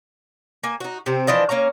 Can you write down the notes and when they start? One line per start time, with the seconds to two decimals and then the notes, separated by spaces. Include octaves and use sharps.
0.64 A#3 G#5
0.80 D#4 F#4
1.06 C3 C4
1.27 E3 F3 D4 D#5
1.49 A#3 C#4 F5 A#5